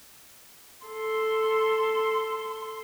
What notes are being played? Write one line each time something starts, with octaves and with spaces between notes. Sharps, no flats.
A4 C6